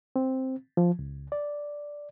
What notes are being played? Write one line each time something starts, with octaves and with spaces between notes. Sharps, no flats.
C4
F3
C#2
D5